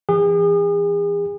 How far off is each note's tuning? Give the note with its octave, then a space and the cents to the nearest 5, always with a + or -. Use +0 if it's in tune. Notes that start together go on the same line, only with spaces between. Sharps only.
E3 +30 G#4 -40